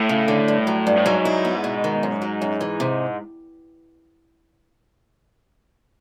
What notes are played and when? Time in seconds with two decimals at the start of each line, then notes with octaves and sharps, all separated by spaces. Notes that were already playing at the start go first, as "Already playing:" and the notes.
Already playing: A2
0.09 C#3
0.28 D3
0.48 G2
0.67 F#3
0.87 G2
0.96 A2
1.06 G#2 F#3
1.25 E4
1.45 B3
1.64 B2
1.84 D#3
2.03 F#2
2.22 F#3
2.42 F#2
2.61 E3
2.80 C3